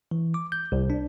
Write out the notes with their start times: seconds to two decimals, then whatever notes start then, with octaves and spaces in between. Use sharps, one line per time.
0.11 E3
0.34 D6
0.52 G6
0.72 C2
0.90 D4